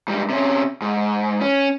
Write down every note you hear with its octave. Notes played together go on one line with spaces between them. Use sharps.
G#2 G3
C3 C#4
G#2
C#4